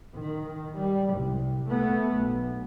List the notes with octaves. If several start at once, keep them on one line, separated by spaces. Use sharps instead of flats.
D#3
G3
C2
A3 B3
B1